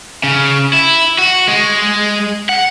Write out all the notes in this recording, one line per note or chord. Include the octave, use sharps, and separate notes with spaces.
C#3
E4
F#4
G#3
F#5